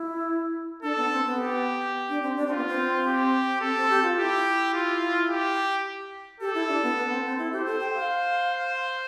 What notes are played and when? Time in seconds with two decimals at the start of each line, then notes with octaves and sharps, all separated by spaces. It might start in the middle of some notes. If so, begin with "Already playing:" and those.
Already playing: E4
0.83 D4 A4
0.97 B3
1.11 C4
1.25 B3
1.38 G4
2.09 D4
2.23 C4
2.36 D4
2.47 C4 F4
2.57 B3
2.67 C4
3.07 G4
3.61 C4 A4
3.76 C4
3.90 G4
4.03 F4
4.18 E4 G4
4.73 F4
5.29 G4
6.40 G4 A4
6.55 E4
6.69 D4
6.83 B3
6.97 B3
7.11 C4
7.25 C4
7.38 E4
7.53 G4 C5
7.66 A4
7.80 G5
7.95 F5